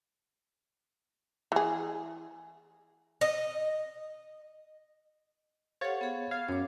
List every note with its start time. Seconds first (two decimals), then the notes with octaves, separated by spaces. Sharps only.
1.52 E3 G#4
3.21 D#5
5.81 G4 A4 C5 C#5 F5 F#5 A6
6.01 B3 G#4
6.31 F5 G#6
6.48 F#2 C#5 D6